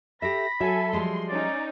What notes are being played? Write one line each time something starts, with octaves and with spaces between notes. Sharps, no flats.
G4 A4 E5 B5 A#6
F#3 A4 E5 G#5
F3 G3 G#3 C6
C#4 D#4 D5